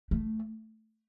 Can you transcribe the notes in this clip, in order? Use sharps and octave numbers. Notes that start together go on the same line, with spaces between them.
A3